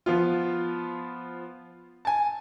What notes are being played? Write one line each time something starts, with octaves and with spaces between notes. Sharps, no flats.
F3 B3 F4
G#5 A5